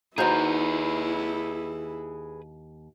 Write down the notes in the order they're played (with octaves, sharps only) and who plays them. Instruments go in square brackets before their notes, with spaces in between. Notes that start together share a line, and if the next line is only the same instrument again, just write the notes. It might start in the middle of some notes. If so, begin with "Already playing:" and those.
[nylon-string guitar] D#2 D#4 [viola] E4 [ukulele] F#4 C5 A#5 [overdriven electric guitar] G#4 B4